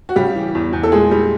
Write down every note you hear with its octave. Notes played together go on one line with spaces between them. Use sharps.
F#4
C#3 G3 G4
E3
E2
E2
A4
A#2 G#3 G#4
G3